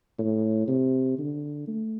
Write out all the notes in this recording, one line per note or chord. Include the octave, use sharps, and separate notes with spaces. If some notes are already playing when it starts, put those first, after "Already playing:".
A2
C3
D3
A3